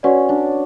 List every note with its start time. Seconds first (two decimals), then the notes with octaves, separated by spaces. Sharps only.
0.03 C#4 F#4 B4 D5 F#5
0.29 D4